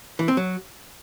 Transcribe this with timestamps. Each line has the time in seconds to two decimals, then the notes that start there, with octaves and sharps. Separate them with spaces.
0.19 E3
0.28 C4
0.37 F#3